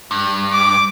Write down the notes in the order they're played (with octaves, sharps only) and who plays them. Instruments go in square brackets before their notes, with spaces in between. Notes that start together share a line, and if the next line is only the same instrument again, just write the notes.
[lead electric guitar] G2
[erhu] D6